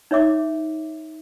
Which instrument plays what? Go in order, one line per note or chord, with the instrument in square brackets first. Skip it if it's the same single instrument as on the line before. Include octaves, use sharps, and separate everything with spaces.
[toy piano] D#4 C#5 E5 D6